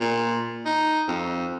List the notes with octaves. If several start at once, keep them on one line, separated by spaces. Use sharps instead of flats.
A#2
D#4
F2